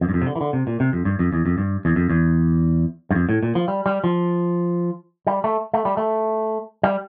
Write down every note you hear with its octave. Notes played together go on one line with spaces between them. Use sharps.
F2
G2
F2
C3
D3
E3
D3
C3
A#2
C3
F2
G2
F2
E2
F2
G2
E2
F2
E2
G2
F2
A2
A#2
F3
G3
G3
F3
G3
A3
A3
G3
A3
G3